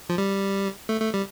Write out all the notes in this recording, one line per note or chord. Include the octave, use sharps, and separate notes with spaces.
F3
G3
A3
A3
G3